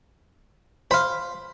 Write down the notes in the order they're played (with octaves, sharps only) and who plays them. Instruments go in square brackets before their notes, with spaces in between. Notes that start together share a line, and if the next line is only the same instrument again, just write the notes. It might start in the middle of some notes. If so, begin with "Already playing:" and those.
[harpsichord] C5 [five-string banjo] F5 B5